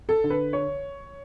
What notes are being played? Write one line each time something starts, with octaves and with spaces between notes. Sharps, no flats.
A4
D3
B4
C#5